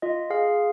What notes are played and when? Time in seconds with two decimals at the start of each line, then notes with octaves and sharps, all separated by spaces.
0.02 F4 D#5
0.30 G#4 F5